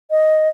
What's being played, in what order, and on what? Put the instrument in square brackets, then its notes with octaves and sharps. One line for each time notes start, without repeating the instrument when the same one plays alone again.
[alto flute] D#5